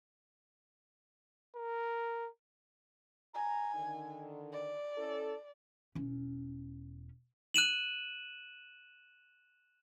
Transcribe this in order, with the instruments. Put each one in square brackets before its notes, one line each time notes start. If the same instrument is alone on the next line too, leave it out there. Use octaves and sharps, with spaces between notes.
[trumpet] A#4
[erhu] G#5 [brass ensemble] A#5
[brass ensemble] D3 D#3
[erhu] D5
[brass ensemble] C#4 E4 A4
[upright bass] E1 C#4
[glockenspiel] F#6 D#7 E7 F#7